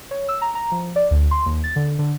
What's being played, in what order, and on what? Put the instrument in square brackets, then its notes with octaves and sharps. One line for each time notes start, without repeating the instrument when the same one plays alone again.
[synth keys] C#5
E6
A#5
A#5
F3
D5
D2
C6
D#2
A6
D3
D3